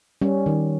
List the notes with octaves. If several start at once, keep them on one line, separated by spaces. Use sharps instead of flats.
G3 C#4
D#3